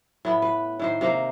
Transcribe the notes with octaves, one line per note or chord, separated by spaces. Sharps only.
A2 B3 B4
B4
A2 D#3 C5
C3 A#3 C5